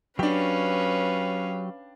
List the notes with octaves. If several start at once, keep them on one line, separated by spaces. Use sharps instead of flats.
F#3 C#4 D4 G4 B4 F5 G5